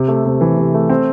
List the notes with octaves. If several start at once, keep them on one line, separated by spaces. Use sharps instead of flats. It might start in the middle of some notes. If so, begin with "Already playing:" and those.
Already playing: C3
A3
C3
E3
C3
A3
C4